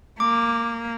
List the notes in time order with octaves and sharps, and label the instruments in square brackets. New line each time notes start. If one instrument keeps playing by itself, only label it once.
[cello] A#3 [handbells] D6